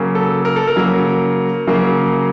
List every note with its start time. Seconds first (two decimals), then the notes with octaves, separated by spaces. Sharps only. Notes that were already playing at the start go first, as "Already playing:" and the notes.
Already playing: C#3 F#3 A#3
0.15 A4
0.45 A#4
0.56 A4
0.67 A#4
0.76 C#3 F#3 A#3
1.67 C#3 F#3 A#3